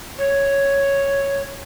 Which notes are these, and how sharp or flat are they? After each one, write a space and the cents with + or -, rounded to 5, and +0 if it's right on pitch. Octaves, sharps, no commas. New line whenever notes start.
C#5 +0